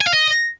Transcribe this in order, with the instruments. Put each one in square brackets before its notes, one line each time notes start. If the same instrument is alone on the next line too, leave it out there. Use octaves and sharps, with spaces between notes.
[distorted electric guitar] G#5
F5
D#5